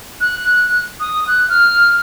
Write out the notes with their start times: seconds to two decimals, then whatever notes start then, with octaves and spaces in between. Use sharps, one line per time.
0.21 F#6
1.00 D#6
1.27 F#6
1.49 F6